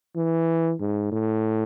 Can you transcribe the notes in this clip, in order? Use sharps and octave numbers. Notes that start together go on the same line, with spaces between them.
E3
G#2
A2